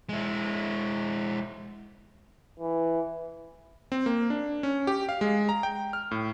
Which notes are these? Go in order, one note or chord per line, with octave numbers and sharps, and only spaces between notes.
G#3 E4
E3
C4
A#3
D4
C#4
G4
F5
G#3
A#5
G5
F6
A2